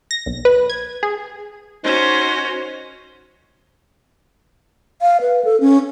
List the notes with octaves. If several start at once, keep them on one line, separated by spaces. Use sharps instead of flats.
A#6
B1
B4
G#6
G#4
C#4 D#4 F#4 C5
F5
B4
A4
C#4